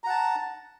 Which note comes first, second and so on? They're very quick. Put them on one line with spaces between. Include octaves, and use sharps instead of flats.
A#5 F#5 A5